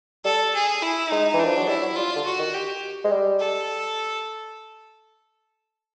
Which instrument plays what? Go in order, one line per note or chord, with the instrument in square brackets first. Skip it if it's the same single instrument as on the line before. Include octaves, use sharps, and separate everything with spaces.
[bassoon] G3 [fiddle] A4
[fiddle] G#4
E4
[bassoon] G#3 [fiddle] D#4
[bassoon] E3
[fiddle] D4
[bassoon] F3
F#3
[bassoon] G3 [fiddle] E4
[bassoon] F#3
[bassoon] G3 [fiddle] F4
[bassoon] D3
[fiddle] F#4
[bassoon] D#3
[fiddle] G4
[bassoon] G#3
G3
[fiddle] A4